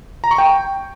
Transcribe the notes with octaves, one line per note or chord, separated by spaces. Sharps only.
A#5
C#6
G5